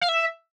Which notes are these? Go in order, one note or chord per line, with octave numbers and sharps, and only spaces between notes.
F5
E5